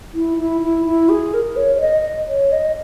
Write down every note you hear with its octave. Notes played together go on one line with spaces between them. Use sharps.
E4
E4
E4
E4
G#4
A#4
C#5
C#5
D#5
C#5
D#5